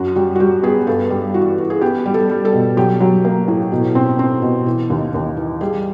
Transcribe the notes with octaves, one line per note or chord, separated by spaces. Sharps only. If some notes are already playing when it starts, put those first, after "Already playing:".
Already playing: F#2 F#4
G3 F#4
F#4
G3 G4
B3 G#4
G2 A4
G3
E3 F#4
E3
G#4
B3 G4
G3
A4
G3
A4
B2
F#3 G4
F#3
A#3
A2
B2
C4
C4
B2
E3
D#2
D#2
E3
G3 G#4